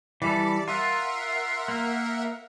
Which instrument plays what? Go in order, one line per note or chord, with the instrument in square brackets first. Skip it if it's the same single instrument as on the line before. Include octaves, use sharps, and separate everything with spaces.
[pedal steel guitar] E3 G3 A4 [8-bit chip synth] D5
[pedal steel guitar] F4 [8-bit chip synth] A#4 E5 F#5
[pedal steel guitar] A#3